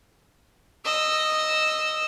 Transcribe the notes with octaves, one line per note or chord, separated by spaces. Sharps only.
D#5 E6